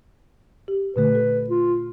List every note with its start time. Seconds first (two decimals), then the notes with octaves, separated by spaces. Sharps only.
0.68 G4
0.96 A#2 D3 A3 B4
1.15 A4
1.49 F4